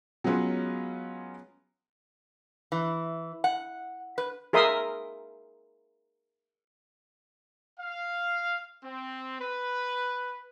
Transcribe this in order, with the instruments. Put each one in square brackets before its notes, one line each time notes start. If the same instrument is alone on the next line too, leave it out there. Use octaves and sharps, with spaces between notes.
[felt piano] F#3 G#3 B3 C#4 F4
[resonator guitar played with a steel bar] E3
F#5
B4
[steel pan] G#4 A#4 E5 C6 D#6
[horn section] F5
C4
B4